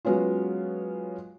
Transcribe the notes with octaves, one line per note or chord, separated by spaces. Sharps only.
F#3 G#3 B3 C#4 F4